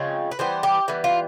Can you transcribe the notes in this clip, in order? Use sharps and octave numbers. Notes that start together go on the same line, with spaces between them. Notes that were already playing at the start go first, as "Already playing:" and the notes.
Already playing: C#3 F3 G#3 C4 C#5
B4
E3 G3 B3 C5
G4
E3 G3 B3
F4